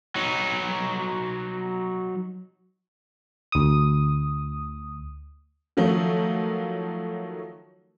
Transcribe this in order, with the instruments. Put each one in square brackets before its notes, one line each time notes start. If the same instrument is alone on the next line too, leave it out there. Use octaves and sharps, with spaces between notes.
[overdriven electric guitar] F#3 D#4
[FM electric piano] D2 D#6
[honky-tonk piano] D#3 F3 F#3 A3 D#4